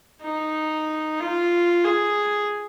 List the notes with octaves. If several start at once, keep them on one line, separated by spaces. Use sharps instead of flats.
D#4
F4
G#4